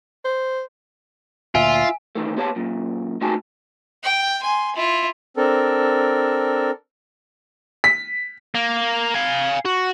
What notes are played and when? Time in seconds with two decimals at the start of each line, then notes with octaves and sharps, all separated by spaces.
0.24 C5
1.55 D2 A#2 F4 E5 G#5
2.15 D#3 E3 A3
2.37 B3 G4 C#5 D#5 A5
2.56 F#2 A#2
3.21 A3 D#4 F#4 G4 G#5 A5
4.04 G5
4.42 G#5 C6
4.76 E4 F4
5.37 C4 D4 A4 A#4
7.84 B6
8.55 A#3
9.15 F5 G#5
9.65 F#4